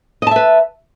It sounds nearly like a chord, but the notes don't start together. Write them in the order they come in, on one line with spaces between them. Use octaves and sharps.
D#5 A5 E5 B4